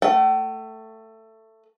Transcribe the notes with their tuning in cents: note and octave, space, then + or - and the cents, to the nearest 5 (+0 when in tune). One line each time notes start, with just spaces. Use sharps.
A3 +15 G5 -45